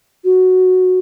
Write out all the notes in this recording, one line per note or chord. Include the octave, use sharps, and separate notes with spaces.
F#4